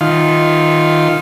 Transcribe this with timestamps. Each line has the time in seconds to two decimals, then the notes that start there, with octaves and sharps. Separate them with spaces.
0.01 D#3 F4